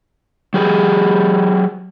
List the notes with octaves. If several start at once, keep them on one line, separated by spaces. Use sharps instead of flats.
F#3 G4 G#4